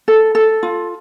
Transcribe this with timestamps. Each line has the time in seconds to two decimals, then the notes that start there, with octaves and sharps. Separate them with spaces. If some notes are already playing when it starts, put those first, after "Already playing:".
0.08 A4
0.35 A4
0.63 F4